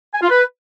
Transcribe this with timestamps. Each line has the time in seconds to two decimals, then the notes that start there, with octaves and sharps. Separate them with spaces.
0.13 G#5
0.21 F4
0.30 B4